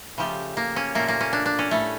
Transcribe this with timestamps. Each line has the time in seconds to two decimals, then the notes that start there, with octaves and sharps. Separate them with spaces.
0.18 C#3 F3 A3 G4
0.57 A#3
0.76 C#4
0.95 A#2 A3 A#3
1.08 A#3
1.21 C#4
1.33 D4
1.46 D4
1.59 C#4
1.71 A2 G3 A3